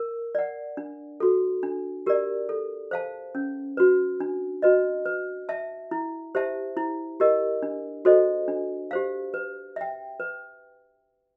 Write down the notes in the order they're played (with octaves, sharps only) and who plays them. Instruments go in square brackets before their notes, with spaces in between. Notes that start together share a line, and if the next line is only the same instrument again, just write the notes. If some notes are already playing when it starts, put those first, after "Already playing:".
Already playing: [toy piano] A#4
D5 F#5
D4
F#4 A4
D4
G4 A#4 D5
A4
C5 F5 A5
C#4
F#4 B4
D4
F#4 B4 D#5
B4
E5 A5
E4
G4 C5 E5 A5
E4
G4 A#4 D#5
D4
F#4 A4 C5 D#5
D4
G4 C5 F5
B4
E5 G5
B4